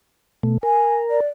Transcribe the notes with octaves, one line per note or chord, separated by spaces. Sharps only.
B2 A3
A#4 G#5
D5